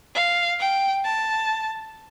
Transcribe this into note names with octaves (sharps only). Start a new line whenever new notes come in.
F5
G5
A5